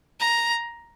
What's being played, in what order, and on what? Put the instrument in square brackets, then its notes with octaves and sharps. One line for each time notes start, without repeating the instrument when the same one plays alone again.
[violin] A#5